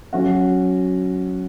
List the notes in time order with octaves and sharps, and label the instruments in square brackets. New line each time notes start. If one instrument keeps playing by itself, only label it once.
[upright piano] F#3 C#4 F#4